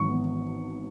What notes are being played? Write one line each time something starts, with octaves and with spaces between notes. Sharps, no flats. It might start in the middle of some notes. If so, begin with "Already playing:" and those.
Already playing: G#1 E3 F#3 C#6
B3